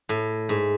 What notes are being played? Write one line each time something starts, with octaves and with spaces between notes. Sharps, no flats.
A2
G#2